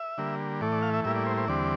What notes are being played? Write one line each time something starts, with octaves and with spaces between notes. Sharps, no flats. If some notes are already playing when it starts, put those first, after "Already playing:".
Already playing: E5
D3 G3 A#3
A2 E3 A3 D5
D5
F5
E5
A2 G3 A#3 E4 E5
D5
C5
C5
E2 D3 G3 C4 D5